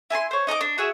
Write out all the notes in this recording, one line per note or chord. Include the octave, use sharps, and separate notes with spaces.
E4 G#5 A5 C6
C5 C#5
D#4 D#5 A5 D6
D4
F#4 G#4 E5